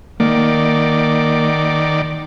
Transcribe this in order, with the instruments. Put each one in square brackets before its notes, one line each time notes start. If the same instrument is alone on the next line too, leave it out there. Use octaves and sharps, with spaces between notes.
[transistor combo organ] D#3 D5 [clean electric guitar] A#3